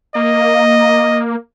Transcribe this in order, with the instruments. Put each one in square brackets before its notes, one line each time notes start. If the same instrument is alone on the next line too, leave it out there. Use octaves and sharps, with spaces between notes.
[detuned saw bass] A#3 [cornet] D#5